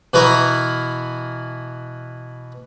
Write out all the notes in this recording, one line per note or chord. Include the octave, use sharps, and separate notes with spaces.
B2 E3 E4 A#4